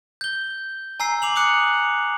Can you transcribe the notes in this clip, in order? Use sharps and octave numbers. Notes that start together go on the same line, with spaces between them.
G6 G7
G#5 A#5 E6 C7
D6 F7 F#7
D6 D#6 F#6 C#7